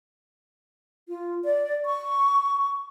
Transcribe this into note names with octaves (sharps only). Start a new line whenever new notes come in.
F4
D5
C#6